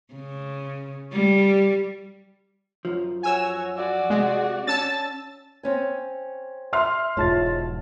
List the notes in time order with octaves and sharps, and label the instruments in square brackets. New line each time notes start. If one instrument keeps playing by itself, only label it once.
[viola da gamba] C#3
G3
[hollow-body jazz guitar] F#2 F3
[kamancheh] F#4 C#5 [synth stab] G#5 E6
[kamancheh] F#4 D5
[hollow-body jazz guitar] C3 F#5 [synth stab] G#3
[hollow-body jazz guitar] C#4 [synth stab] A5 E6 A6
[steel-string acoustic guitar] C4 C#4 G#5
[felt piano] E5 C6 F6
[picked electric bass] E1 G#2 [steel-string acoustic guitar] F3 [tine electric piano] C#5 A5 A6